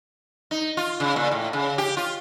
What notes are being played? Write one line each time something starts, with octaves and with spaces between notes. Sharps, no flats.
D#4
F4
C#3
A#2
A2
C#3
G4
F4